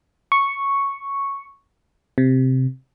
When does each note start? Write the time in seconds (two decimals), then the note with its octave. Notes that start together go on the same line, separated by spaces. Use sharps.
0.32 C#6
2.18 C3